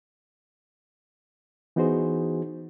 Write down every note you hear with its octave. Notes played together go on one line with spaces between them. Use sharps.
E3 B3 D#4 F#4 G#4 C5